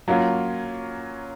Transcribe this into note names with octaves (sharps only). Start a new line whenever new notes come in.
F#3 A#3 C#4 F4